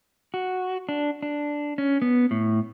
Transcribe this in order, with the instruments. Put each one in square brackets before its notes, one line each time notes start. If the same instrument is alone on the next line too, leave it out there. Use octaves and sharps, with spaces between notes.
[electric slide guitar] F#4
D4
D4
C#4
B3
A2